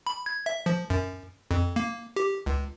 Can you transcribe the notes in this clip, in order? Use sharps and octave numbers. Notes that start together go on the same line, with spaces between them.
B5
G#6
E5
F3
F#2
F2
A#3
G4
C#2